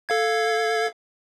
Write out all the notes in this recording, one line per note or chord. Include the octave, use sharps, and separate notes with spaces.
A4 F5 G#6